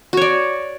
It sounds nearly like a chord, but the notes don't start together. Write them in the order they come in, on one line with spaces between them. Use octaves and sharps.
F#4 C#5 D5